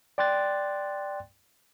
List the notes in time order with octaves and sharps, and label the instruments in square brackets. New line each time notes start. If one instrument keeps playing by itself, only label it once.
[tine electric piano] D5 G5 C6 F#6 A6